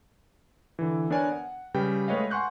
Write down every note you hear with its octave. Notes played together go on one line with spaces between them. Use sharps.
D3 E3
B3 D4 A#4 C#5 D5 G#5
F#5
C#3 G3 B4 G5
G#3 A3 B4 C#5 D#5 F5
F#5 G#5 C6 C#6 F#6 G6